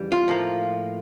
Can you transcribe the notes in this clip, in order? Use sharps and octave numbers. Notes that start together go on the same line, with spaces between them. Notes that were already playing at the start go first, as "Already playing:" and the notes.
Already playing: F2 C#3 E3 G3
F4
A2 F3 A#3